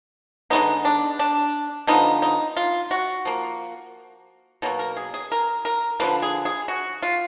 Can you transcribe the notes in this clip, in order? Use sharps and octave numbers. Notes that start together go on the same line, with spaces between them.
D3 G#3 B3 D#4
D4
D4
D3 F3 B3 D#4
D#4
F4
F#4
F3 A#3
B2 F#3 A#3
A#4
G#4
G#4
A#4
A#4
D3 F3 A#3 B4
G#4
G#4
F#4
F4